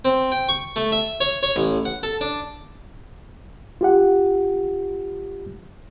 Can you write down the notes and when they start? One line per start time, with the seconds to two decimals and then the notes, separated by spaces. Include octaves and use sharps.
0.05 C4
0.32 G5
0.49 C#6
0.76 A3
0.92 E5
1.21 C#5
1.43 C#5
1.56 A1
1.85 F#5
2.03 A4
2.21 D4
3.81 F4 G4 F#5